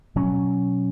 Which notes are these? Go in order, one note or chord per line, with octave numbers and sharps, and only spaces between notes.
B2 F#3 C#4